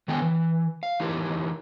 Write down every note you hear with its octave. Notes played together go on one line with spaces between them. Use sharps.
D#3 F#3 B3 A4 G5 G#5
E3
F5
E3 D#4 E4 G4 A#4